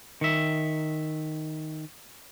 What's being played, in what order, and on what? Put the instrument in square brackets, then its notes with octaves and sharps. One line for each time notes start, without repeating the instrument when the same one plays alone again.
[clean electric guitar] D#3 E5